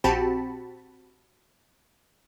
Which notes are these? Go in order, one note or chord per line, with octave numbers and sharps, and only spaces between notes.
A#1 C4 F#4 G4 A5 B5